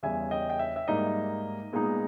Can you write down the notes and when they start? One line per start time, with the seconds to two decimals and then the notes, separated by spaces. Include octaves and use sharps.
0.03 E2 C#3 G3 C#4 E5 G#5
0.31 D#5 G5
0.50 G5
0.59 E5
0.76 E5
0.88 G#2 G3 A#3 D#4 D#5
1.73 A#2 G#3 B3 D#4